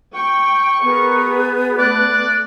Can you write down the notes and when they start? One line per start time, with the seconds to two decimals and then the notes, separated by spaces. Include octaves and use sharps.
0.14 G5 C#6
0.83 B3 G#4 A#4
1.26 G#4
1.78 A3 D5 F#6